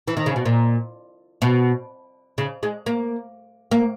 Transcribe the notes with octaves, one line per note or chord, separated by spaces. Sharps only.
E3
D#3
C#3
B2
A#2
B2
C#3
G#3
A#3
A#3